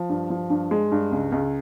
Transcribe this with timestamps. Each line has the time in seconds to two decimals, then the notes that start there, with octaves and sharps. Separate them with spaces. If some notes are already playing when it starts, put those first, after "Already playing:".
Already playing: F3
0.09 G2
0.30 F3
0.50 G2
0.71 G#3
0.92 G2
1.12 C#2
1.32 C#2